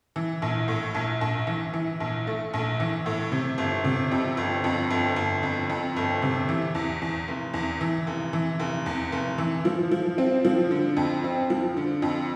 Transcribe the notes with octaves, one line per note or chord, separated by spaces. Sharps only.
E3
A#1
A2
A#1
A#1
E3
E3
A#1
A3
A#1
E3
A2
C3
G1
C3
F2
G1
F2
G1
G1
F2
F2
G1
C3
E3
E2
E2
F1
E2
E3
F1
E3
F1
E2
F1
E3
F3
F3
C4
F3
D3
F2
C4
F3
D3
F2